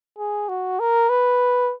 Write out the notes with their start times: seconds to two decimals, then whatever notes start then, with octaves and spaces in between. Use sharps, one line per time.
0.19 G#4
0.49 F#4
0.80 A#4
1.10 B4